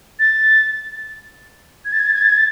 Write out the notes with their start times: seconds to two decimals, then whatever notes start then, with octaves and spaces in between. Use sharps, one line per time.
0.19 A6
1.85 G#6
1.93 A6
1.99 G#6
2.06 A6
2.14 G#6
2.22 A6
2.29 G#6
2.37 A6